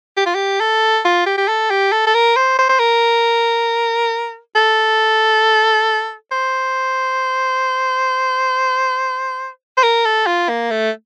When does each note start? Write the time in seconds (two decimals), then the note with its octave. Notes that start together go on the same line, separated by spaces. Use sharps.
0.17 G4
0.26 F4
0.35 G4
0.60 A4
1.04 F4
1.26 G4
1.37 G4
1.48 A4
1.70 G4
1.92 A4
2.07 A4
2.14 A#4
2.36 C5
2.59 C5
2.69 C5
2.80 A#4
4.55 A4
6.32 C5
9.77 C5
9.83 A#4
10.05 A4
10.27 F4
10.49 A#3
10.71 A3